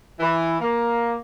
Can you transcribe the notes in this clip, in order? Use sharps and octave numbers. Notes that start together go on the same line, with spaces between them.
E3
A#3